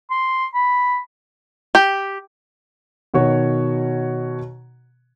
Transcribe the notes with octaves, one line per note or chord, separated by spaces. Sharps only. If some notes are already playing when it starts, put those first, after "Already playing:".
C6
B5
G4
B2 D#3 F#4 C#5